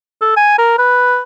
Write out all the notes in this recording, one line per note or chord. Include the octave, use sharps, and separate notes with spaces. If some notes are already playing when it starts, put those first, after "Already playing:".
A4
G#5
A#4
B4